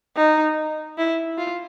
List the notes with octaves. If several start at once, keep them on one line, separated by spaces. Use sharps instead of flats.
D#4
E4
F4